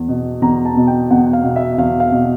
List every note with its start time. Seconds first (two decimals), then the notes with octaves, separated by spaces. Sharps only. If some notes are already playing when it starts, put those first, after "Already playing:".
Already playing: E2
0.08 B2
0.41 E2 A#5
0.65 A5
0.76 B2
0.87 G5
1.10 E2 F#5
1.33 F5
1.43 B2
1.56 E5
1.78 E2 F5
2.00 F5
2.12 B2